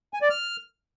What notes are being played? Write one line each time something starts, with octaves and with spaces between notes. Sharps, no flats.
G#5
D5
F6